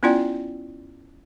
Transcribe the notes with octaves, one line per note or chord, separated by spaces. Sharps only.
B3 C#4 E4 F4 D5 G5